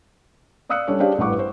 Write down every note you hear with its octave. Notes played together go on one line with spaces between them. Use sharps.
D5 F5 D#6 E6 F#6 C#7
G3 C#4 D4 A4 C#5
D4 G4 G#4 C5 D5 F5
A1 G2 B4 F#5 C#6 D6
C5